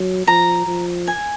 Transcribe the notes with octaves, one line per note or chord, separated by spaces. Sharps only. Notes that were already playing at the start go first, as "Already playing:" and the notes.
Already playing: F#3
F3 A#5
F3
G#5